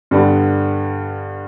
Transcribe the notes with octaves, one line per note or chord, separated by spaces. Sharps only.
G2 D3 G3 B3